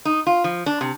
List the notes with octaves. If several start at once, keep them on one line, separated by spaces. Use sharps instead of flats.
D#4
F4
F3
D4
C3